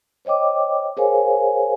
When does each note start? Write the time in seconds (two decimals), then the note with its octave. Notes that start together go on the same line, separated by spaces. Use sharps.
0.25 C5 C#5 D#5 G5 D6
0.97 G#4 A#4 C5 C#5 F5 G#5